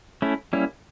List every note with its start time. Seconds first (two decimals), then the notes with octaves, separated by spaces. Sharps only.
0.22 A3 C#4 E4
0.53 G3 A#3 C#4 E4